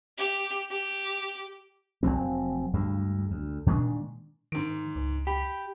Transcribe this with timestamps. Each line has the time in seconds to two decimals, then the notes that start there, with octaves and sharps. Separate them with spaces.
0.18 G4
0.71 G4
2.03 F1 F#2 F#3 C4
2.74 D2 G2 G#3
3.31 D2
3.66 A#2 D#3 G#3 D4
4.52 G#2 D#3 D7
4.96 C#2
5.27 G4 B5